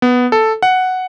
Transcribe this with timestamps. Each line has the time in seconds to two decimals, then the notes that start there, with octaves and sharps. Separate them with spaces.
0.02 B3
0.32 A4
0.62 F#5